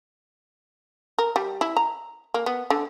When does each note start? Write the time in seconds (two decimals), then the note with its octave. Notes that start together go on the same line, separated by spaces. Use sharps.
1.18 A#4
1.36 G3
1.61 E4
1.77 A#5
2.34 A#3
2.46 B3
2.70 D3